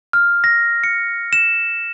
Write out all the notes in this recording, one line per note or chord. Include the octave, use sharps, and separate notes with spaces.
F6
A#6
C#7
E7